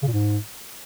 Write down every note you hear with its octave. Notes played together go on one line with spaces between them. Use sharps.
C#3
A#2
G#2